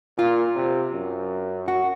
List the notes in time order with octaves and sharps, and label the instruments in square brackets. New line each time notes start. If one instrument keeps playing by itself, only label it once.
[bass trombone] A#2 [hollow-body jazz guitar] F4
[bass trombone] C3
F#2
[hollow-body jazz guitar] F#4